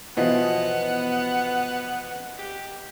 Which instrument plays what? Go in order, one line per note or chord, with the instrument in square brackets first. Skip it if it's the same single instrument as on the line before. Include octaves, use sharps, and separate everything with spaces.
[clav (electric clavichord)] B2 E3 F3 [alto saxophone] B3 [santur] D#5 E5 [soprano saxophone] F#5
[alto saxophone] G4